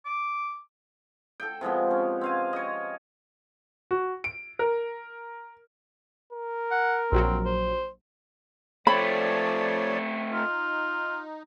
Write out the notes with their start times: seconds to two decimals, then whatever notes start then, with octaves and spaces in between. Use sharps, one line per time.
0.05 D6
1.40 A4 G5
1.61 C3 F3 G#3 B3
1.90 C#4
2.21 C4 F5 G#5
2.53 C#5 D#5
3.91 F#4
4.24 D7
4.59 A#4
6.33 A#4
6.71 F#5
7.12 A#1 F#3 C4
7.45 C5
8.87 F3 A3 C4 C#5 D5 B5
10.33 D#4 F4